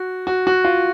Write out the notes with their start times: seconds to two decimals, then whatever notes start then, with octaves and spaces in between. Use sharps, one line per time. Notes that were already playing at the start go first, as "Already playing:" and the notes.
Already playing: F#4
0.27 F#4
0.47 F#4
0.65 F4